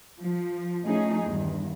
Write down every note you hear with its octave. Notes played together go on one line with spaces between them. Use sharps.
F3
F3 A3 C#4 D#4 G#4
E2 G2 D#3